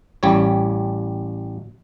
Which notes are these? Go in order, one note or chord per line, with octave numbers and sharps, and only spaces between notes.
A1 G3 C#5